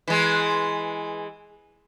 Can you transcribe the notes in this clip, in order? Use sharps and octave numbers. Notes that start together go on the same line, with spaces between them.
E3 G#3